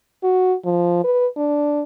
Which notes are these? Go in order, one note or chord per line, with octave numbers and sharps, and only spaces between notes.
F#4
F3
B4
D4